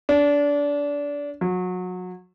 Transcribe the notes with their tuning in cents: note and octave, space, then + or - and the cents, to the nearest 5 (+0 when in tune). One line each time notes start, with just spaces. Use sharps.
D4 -25
F#3 -25